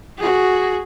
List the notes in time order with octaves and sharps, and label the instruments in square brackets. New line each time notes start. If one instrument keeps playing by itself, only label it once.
[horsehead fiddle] F#4 G#4